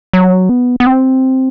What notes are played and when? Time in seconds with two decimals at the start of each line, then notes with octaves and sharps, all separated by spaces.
0.13 F#3
0.49 B3
0.80 B3
0.86 C4